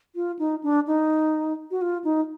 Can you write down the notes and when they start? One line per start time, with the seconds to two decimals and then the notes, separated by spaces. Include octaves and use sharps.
0.15 F4
0.39 D#4
0.63 D4
0.87 D#4
1.71 F#4
1.81 F4
2.04 D#4